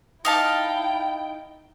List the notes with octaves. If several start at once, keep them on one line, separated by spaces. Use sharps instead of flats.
D#4 E4 F5 G5 A5